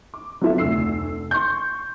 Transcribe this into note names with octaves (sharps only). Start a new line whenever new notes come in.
D6
F#3 B3 C4 F4 A4 E5
F1 D2 E6 C7
C6 C#6 G6